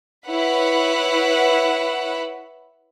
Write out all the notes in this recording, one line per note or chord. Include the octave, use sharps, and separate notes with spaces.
E4 B4 C#5 F#5 B5